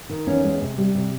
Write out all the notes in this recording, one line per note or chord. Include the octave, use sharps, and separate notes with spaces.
D#3
E2 C#4
G#3
C3
G3
C3